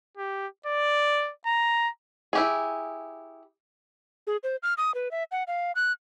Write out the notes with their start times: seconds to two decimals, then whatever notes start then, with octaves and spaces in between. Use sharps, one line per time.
0.17 G4
0.66 D5
1.47 A#5
2.33 E4 G4 G#4
4.27 G#4
4.43 C5
4.63 F6
4.78 D#6
4.95 B4
5.11 E5
5.32 F#5
5.48 F5
5.76 F#6